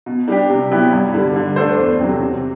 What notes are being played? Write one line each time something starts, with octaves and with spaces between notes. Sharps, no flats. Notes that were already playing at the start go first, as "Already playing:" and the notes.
B2
G3 D4 G4
C3
F#3 B3 E4 G4
G2
D3 G3
D3
A3 D4 A4 C5
E2
C3 F#3 C4
C3